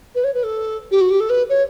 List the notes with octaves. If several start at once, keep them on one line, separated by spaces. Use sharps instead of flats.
B4
C#5
B4
A4
G4
F#4
G4
A4
B4
C#5